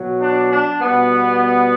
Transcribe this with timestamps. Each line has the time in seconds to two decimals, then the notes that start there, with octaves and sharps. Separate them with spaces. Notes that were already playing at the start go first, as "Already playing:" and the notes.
Already playing: B2 F#3
0.21 D4
0.52 D4
0.82 B2 G3 B3